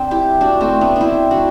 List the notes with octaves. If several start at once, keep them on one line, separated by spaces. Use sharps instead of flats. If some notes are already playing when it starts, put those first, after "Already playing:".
Already playing: C4 D4
E4 G4
D4 F#4
A3 C4
B3 D4
C4 D4 E4
D4 F#4